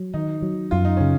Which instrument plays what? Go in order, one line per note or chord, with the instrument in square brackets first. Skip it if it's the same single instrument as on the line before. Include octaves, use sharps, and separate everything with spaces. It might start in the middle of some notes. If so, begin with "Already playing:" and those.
Already playing: [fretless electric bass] F#3
[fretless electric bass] D#3 [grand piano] D#4
[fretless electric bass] F#3
[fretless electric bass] F#2 [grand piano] F4
[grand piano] D#4
[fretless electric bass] C#3 [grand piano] C#4